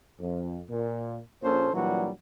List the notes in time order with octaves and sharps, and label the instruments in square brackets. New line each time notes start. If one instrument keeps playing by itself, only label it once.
[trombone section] F2
A#2
A#1 A#2 C#4 A4 C5
A#2 E3 F#3 G3 D4 F#4